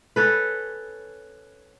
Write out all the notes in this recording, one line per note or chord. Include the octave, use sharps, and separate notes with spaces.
C#4 A4 B4